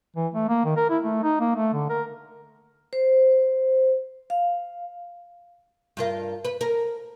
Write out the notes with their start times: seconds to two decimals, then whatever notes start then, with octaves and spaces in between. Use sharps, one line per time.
0.16 E3
0.34 A3
0.48 A#3
0.65 D#3
0.76 A#4
0.89 E4
1.03 A3
1.23 D#4
1.40 A#3
1.55 A3
1.73 D3
1.90 A#4
2.93 C5
4.30 F5
5.97 G2 F4 A#4
6.45 B4
6.61 A#4